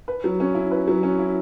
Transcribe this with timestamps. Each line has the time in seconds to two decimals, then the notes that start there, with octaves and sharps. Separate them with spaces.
0.08 B4
0.24 F#3
0.40 C#4
0.55 E4
0.71 B4
0.88 F#3
1.03 C#4
1.19 E4